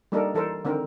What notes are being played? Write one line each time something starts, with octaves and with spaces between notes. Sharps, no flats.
G3 A#3 D4 D#4 A4 A#4
E3 A4 A#4 C5
D3 D#3 C4 A#4